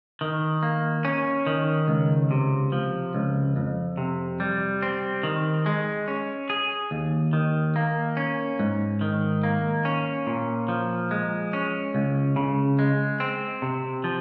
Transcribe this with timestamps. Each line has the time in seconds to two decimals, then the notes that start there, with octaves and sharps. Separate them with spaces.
0.21 D#3
0.63 A#3
1.05 C#4
1.47 D#3
1.88 C#2
2.31 C3
2.72 F3
3.14 C#2
3.56 F2
3.97 C3
4.40 G3
4.83 C4
5.23 D#3
5.66 G#3
6.08 C#4
6.50 G#4
6.91 D#2
7.33 D#3
7.76 A#3
8.17 C#4
8.60 G#2
9.01 D#3
9.43 A#3
9.85 C#4
10.27 A#2
10.68 F3
11.11 G#3
11.53 C#4
11.95 C#2
12.36 C#3
12.79 G#3
13.20 C4
13.62 C3
14.04 F3